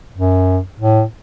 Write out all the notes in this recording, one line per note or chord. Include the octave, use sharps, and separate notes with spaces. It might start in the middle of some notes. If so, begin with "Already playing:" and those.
F#2
A2